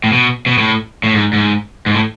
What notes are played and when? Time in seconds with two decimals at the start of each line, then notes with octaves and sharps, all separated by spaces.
0.04 A2
0.13 B2
0.46 B2
0.58 A2
1.04 A2
1.13 G#2
1.33 G#2
1.86 G#2
1.94 A2